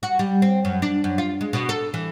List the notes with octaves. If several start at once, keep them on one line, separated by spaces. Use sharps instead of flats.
F#4
G3
C4
F#2
D4
F#2
F4
G#3
B2
A4
E3